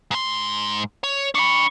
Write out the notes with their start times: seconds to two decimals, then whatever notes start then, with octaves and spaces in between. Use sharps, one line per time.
0.11 G#2 C6
1.04 C#5
1.35 D4 B5 C#6